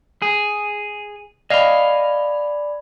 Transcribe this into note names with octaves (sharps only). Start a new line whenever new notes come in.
G#4
D5 D#5 F5 G#5 B5